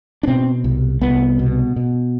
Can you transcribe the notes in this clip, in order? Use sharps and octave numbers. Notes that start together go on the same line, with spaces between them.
D4
B2 C4
C2
C2 B3
B2
B2